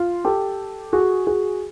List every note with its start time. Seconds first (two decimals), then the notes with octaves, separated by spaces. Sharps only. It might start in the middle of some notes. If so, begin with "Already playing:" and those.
Already playing: F4
0.25 G4 A4
0.93 F#4 G#4
1.27 F#4 G#4